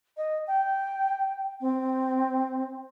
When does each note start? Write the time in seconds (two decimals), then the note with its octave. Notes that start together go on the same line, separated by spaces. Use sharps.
0.17 D#5
0.47 G5
1.61 C4